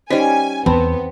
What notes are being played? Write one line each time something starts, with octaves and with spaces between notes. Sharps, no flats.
G3 C#4 D#4 C5 D#5 G#5
E2 B3 C4 A5 B5